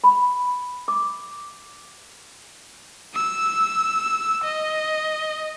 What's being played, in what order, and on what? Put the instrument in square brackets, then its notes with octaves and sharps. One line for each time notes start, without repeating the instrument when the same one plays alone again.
[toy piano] B5
D6
[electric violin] E6
D#5